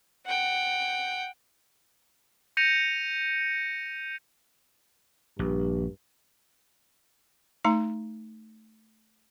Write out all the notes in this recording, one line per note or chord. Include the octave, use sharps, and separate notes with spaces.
F#5 G5
G6 A#6 C#7 D#7 F7
A#1 G2
A3 D#4 A#5